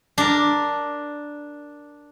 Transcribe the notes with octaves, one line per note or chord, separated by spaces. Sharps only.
D4 A#4